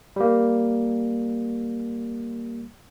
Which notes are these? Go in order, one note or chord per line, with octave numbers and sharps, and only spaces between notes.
G3 A#3